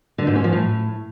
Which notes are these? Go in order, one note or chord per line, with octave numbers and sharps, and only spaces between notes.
D3
G#2
C#4
F3
A2